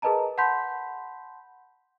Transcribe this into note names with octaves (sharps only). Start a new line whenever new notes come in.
G#4 A#4 B4 D#5 A5 A#5
F#5 A5 B5 C6 G6 B6